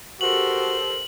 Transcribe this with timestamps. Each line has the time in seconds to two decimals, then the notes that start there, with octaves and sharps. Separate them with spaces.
0.21 F#4 G4 A4 A#4 C5 F#7